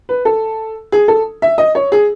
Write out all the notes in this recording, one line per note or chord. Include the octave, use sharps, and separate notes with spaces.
B4
A4
G#4
A4
E5
D#5
C#5
G#4